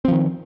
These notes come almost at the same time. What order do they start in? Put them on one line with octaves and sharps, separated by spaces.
C4 F3 D#3